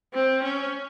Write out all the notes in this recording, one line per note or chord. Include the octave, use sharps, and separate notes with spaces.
C4
C#4